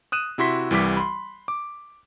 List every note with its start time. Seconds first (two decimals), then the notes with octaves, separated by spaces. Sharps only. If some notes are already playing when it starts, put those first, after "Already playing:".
0.12 D#6 F#6 D#7 E7
0.38 C3 E4 F#4 C6 B6
0.71 C2 E3 G3 D6 B6
0.97 B5 C6
1.48 D6